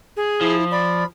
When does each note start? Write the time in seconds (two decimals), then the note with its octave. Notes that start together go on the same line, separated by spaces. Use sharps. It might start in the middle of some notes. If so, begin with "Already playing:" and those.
0.17 G#4
0.41 F3 E4
0.71 D5 B5